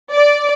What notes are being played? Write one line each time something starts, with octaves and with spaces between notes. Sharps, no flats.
D5